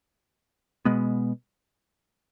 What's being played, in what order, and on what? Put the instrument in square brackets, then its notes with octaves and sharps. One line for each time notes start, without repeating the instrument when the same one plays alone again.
[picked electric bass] B2 G#3 B3